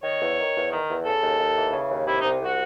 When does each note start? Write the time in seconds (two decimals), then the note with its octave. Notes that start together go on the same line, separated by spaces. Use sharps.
0.03 D#3 C#5
0.20 E2
0.37 D#3
0.54 E2
0.71 D#3
0.88 E2
1.05 C#3 A4
1.22 D#2
1.39 D#2
1.56 E3
1.73 C#3
1.90 D#2
2.06 C3 E4
2.19 D#4
2.23 C2
2.40 C2 F#4